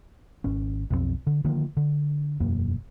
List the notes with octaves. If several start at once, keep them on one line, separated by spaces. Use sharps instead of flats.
G#1 C#4
B1 F2 G3 C4
D3
D3 D#3 F3 A#3
D3
E1 F#2 A#3